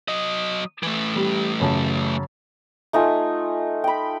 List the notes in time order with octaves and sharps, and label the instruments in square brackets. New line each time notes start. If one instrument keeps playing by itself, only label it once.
[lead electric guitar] F#3 D#5
E3 A3
[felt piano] G3
F#2 C#3 A5
[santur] A3 D#4 F4 G#5
G5 B5